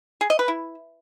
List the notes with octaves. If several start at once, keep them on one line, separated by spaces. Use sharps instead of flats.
G#4
D#5
B4
E4